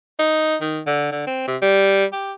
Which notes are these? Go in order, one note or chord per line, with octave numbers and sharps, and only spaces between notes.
D#4
D#3
D3
D3
C4
C3
G3
G4